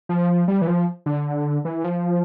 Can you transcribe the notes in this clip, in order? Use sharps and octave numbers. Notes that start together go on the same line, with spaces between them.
F3
G3
E3
F3
D3
E3
F3